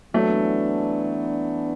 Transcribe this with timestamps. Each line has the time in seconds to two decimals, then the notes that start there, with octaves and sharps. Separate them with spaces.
0.14 E3 F#3 A3 B3 D4